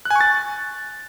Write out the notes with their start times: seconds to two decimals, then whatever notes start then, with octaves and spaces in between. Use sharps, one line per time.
0.05 F#6
0.10 G#5
0.16 C#6
0.21 A6